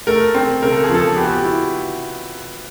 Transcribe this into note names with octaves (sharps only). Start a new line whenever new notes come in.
A3 A#4
C4
C#3 A#4
A4
G#4
F3 A4
B3 G4
F#4
G4
E4